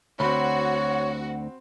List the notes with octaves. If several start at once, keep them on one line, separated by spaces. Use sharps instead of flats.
D2 C4 F#4 C#5 B5